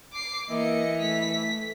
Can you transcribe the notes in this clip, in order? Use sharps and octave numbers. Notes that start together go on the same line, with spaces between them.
D6 C7
E3 A#3 D#5 C#7
A3 B6